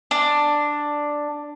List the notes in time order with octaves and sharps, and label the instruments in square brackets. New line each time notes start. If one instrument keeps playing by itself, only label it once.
[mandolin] D4